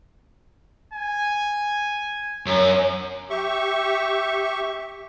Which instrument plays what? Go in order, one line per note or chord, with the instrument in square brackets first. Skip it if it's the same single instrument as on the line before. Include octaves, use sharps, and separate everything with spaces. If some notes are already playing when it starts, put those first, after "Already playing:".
[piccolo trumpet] G#5
[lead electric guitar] F#2
[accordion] G4 E5 C#6